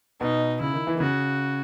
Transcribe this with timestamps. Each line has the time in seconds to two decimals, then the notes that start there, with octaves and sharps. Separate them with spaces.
0.21 B2 D#4
0.60 C#3 E4
0.74 D#3
0.87 E3
0.95 D#3
1.00 C#3 F#4